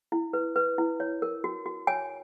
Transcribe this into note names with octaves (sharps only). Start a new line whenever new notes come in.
E4
B4
B4
E4
C#5
A#4
F#4
F#4
C#5 G#5